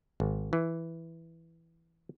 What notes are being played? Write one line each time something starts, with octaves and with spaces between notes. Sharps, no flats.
G#1
E3